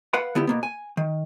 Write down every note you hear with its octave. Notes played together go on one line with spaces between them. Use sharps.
B4 F5 F#5 B5
D3 B3 E4 G4
B2 A#3 B3
G#5
D#3